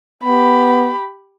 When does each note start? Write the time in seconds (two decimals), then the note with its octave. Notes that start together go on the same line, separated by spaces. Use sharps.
0.24 B3 G4 B5